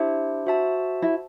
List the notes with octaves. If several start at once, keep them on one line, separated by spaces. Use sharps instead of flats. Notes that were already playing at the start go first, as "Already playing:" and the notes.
Already playing: D4 E4 G4 C5
F#4 C5 E5 A5
E4